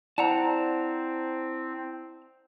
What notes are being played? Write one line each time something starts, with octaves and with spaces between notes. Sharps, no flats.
C4 E4 C5 D5 F#5 A5 A#5